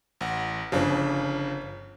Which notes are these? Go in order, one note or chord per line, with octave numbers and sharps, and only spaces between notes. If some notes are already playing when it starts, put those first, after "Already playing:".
A1 F#5
G1 C#3 F3 D4